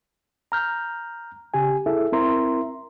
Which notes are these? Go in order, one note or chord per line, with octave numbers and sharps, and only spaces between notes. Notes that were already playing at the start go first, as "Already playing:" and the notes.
A#5 F6 G6
C#3 G4 G#5
E4 G#4 A4 E5
C4 E4 A#4 E5 A#5 C6